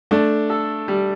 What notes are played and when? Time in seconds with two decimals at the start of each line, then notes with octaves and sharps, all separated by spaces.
0.11 A3 D4
0.50 A4
0.88 G3